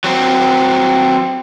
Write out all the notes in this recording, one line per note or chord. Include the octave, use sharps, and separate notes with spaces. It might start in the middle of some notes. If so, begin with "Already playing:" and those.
F#3 C4